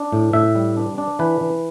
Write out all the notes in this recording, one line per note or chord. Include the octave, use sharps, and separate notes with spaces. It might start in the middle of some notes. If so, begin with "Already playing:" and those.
Already playing: D4
A2
A2 E5
G3
D4
D4
E3 B4
E3